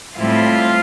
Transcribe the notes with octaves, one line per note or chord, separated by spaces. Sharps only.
A2 G3 C4 E4 F4 F5